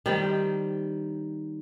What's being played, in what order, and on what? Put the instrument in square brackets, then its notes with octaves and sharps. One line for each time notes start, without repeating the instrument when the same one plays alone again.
[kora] D#3 G3 C4